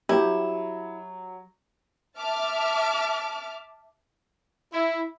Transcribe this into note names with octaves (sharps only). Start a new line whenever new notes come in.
F#3 E4 G4
E5 A5 D6 F6
E4